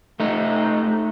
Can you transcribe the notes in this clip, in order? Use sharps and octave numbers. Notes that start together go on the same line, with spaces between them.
A3 D#4